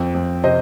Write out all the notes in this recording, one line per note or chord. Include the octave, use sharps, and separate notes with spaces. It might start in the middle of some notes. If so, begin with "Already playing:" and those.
Already playing: F2 C4
F2
C3 C5 D#5